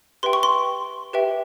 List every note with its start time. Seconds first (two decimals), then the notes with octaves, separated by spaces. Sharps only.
0.23 G4 B4 E5 G5 C6
0.33 C#6
0.43 C6
1.13 G4 B4 E5 G5